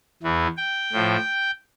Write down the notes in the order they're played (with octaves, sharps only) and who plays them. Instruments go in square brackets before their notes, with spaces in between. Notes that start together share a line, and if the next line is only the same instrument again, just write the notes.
[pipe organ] E2 E3
G5
A2 F3